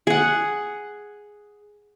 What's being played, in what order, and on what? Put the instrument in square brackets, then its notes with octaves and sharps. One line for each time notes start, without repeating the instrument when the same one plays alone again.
[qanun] G#4 F#5